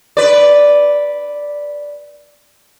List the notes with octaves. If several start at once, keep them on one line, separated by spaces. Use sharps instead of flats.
B4 D5